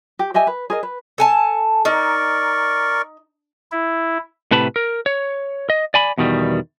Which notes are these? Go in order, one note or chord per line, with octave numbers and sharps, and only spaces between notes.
G4
G4 D#5 E5 G#5
B4
G#4 A#4 D#5
B4
A4 G#5 A5
D#4 A#4 D5 C#6
E4
A2 C3 B4 A5 B5
A#4
C#5
D#5
D5 G#5 B5
E2 B2 D#3 G3